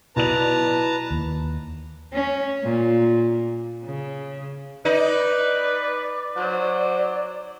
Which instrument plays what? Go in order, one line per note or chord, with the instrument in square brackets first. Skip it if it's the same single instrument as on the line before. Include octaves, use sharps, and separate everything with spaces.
[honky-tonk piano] B1 D5 F7 [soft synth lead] E4 [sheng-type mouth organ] B4 A5 A#5
[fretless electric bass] D#2
[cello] C#4
A#2
C#3
[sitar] D#4 [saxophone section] B4 [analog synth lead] D5
[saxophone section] F#3 C5